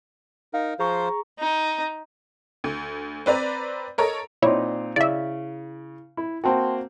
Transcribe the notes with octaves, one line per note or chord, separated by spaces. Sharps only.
D#4 A#4 F5
F3 F4 G#4 C5 A#5 C#6
D#4
D2
C4 B4 D5 A#5
A4 A#4 C#5 D#5 A#5
A#2 C4 D#4 E4 C#5 D5 C6
C#3 E4 D5 E5
E4
A#3 C4 F#4 G5 A5 C6